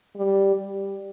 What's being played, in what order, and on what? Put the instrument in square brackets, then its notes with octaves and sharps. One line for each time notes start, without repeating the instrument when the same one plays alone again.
[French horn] G3
G3